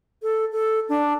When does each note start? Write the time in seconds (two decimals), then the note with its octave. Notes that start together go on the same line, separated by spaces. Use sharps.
0.23 A4
0.52 A4
0.89 D4